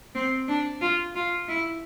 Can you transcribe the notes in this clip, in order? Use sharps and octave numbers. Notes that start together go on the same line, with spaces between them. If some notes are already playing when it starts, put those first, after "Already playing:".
C4
D4
F4
F4
E4